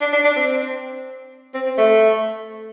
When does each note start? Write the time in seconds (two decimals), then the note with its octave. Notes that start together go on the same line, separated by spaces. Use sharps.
0.01 D4
0.12 D4
0.24 D4
0.36 C4
1.54 C4
1.66 C4
1.78 A3